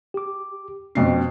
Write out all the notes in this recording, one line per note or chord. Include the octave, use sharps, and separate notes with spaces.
G4 D6
F2 B2 C#4 C5 C7